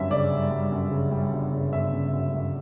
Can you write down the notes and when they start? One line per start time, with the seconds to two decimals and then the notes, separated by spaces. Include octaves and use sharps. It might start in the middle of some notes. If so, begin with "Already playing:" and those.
Already playing: G1 F#2 G3 E5
0.10 C#3 D5
0.31 G3
0.51 G3
0.72 F#2
0.91 C#3
1.11 G3
1.33 G1
1.52 C#3
1.72 G1 E5
1.93 C#3
2.13 F#2
2.34 F#2